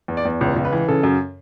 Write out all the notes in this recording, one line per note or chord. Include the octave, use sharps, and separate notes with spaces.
E2
D5
E2
C#2 C#5
C#2
B4
E3
C#3 A4
F#2